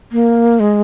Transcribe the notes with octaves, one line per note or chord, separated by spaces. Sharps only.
A#3
G#3